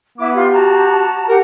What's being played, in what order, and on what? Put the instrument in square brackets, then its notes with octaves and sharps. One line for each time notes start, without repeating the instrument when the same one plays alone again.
[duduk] B3 [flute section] E4 D6
[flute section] F4 [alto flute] G4
[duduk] F#4 [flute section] A5 A#5
[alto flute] G4 [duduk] A#4 [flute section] F#5